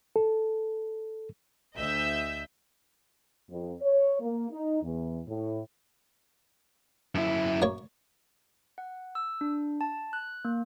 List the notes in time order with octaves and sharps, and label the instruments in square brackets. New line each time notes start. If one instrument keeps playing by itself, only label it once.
[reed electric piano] A4
[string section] D2 D#5 E5 E6 G6 B6
[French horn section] F2
C#5
A#3
D#4
E2
A2
[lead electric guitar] F#2 E4
[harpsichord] F#2 A#3 C#5
[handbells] F#5
E6
D4
A5
F#6
A#3